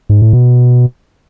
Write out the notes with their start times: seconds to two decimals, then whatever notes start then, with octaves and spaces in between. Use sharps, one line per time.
0.10 G#2
0.22 A2
0.33 B2